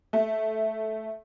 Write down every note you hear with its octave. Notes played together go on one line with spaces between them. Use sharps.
A3